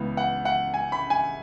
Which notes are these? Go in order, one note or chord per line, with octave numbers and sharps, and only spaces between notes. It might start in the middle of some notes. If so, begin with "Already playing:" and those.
Already playing: C#2 C#3 E3 B3
F#5
F#5
G#5
B5
G#5